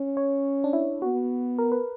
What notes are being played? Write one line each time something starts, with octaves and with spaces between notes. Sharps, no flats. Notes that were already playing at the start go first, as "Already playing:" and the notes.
Already playing: C#4
C#5
D4
E4
B3 F#4
A#4
B4